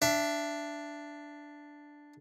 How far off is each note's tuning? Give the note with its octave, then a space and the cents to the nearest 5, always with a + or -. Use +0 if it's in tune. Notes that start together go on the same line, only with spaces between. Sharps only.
D4 +0 E5 +20